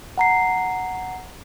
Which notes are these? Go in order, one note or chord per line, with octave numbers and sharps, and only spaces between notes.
F#5 A#5 C7